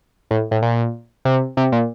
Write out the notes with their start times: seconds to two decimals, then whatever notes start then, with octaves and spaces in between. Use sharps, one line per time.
0.31 A2
0.51 A2
0.62 A#2
1.25 C3
1.57 C3
1.72 A#2